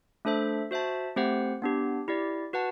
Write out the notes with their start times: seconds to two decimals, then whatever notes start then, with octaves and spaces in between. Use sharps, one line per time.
0.25 A3 D4 A4 C5 E5
0.71 F#4 C5 E5 A5
1.16 A3 C4 G4 C5 F#5
1.62 B3 D4 G4
2.08 E4 G4 D5
2.53 F#4 B4 F#5 A5